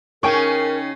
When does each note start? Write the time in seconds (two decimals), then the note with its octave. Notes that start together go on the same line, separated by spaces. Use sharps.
0.23 C#3 C#4 D#4 A#4 G5 G#5 C#6